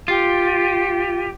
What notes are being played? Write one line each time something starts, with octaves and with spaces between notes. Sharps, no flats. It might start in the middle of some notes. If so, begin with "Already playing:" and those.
F4 G4